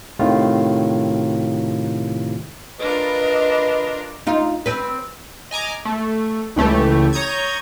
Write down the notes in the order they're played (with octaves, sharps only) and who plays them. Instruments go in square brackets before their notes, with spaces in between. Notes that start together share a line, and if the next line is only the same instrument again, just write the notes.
[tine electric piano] A2 C3 D#3 F4
[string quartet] D4 F4 A#4 [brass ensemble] B4 [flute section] D#5
[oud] D#4 F4
C4 B4
[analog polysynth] D#5 G#5 A#5 D6
A3
C#2 E3 A3 G4
C#5 A#5 D#6 G6 G#6